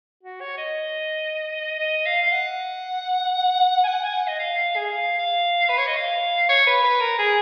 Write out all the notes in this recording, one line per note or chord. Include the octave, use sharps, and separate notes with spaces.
F#4
C#5
D#5
D#5
F5
F5
F#5
G#5
F#5
G#5
F#5
D#5
F5
F5
G#4
F5
F5
B4
C#5
D#5
F5
C#5
B4
B4
A#4
G#4